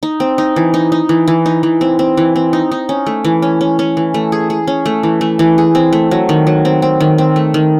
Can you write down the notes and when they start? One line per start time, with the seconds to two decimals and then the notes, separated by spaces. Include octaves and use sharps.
0.03 D#4
0.20 C4
0.38 D#4
0.56 E3
0.74 D#4
0.92 D#4
1.09 E3
1.28 E3
1.46 D#4
1.63 E3
1.81 C4
1.99 C4
2.17 E3
2.36 C4
2.53 D#4
2.71 D#4
2.89 C#4
3.06 A3
3.24 E3
3.42 C#4
3.61 C#4
3.79 C#4
3.97 E3
4.14 A3
4.32 G#4
4.50 G#4
4.67 C#4
4.86 A3
5.03 E3
5.21 A3
5.39 E3
5.58 G#4
5.75 C4
5.93 A3
6.11 F#3
6.29 D#3
6.47 F#3
6.65 C4
6.82 C4
7.00 D#3
7.18 C4
7.36 A3
7.54 D#3